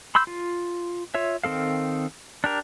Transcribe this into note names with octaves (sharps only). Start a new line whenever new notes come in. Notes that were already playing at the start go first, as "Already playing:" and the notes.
B5 C6 E6 G6
F4
F4 C#5 E5
D#3 C4 A4 F5
D4 G4 A#4